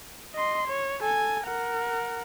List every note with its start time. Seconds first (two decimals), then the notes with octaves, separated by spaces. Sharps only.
0.34 D#5 C6
0.67 C#5
1.02 A4 G#5
1.45 A#4 F#5